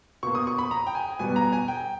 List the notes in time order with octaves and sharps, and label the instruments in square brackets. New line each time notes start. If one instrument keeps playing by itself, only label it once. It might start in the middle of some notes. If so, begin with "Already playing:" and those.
[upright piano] B2 A#3 C#6
D#6
C#6
B5
A#5
G5
G#5
B2 G3 B3 G#5
A#5
G#5
G5